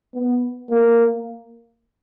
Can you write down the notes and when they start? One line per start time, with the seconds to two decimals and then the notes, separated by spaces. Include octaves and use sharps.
0.15 B3
0.70 A#3